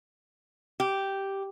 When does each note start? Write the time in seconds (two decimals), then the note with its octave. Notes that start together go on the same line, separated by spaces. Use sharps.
0.80 G4